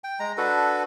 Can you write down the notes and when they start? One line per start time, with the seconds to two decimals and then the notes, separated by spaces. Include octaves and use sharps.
0.04 G5
0.20 G#3 A#5
0.38 D4 F#4 A4 B4